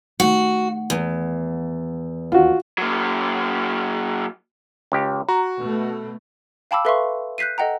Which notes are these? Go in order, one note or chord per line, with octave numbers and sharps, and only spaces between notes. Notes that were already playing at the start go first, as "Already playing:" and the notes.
D#3 A3 F#4
E2
D#2 F4 F#4
F#3 A#3
C#2 G4
F#4 A#5
B2 A3
F5 G5 A5 B5 D6 E6
A4 B4 E5 F5 C6 C#6
F#6 G6 B6 C7 D#7
A4 D#5 F#5 G5 A#5